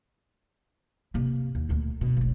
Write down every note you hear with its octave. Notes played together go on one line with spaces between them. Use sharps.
C3 A#3
D#2
D2 A#2
B2
F1 B1